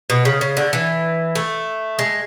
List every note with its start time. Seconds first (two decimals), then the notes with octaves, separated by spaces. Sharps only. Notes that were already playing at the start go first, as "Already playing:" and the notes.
0.10 B2
0.25 C#3
0.41 C#3
0.57 D3
0.73 E3
1.35 A3
1.99 G#3